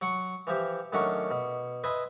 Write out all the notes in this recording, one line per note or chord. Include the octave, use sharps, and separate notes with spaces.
F#3 F#5 C#6
E3 F3 G4
A2 D#3 F#3 C#4 D4 F#4
B2
B4 D#5 E5 G#5 C6